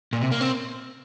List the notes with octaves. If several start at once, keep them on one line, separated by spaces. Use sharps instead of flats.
A#2
C3
A#3
C4